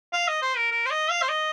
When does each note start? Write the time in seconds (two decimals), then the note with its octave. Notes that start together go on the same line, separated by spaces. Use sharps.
0.13 F5
0.27 D#5
0.42 C5
0.56 A#4
0.71 A#4
0.85 C5
0.91 D#5
1.10 F5
1.22 C5
1.29 D#5